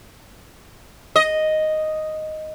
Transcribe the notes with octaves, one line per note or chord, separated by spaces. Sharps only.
D#5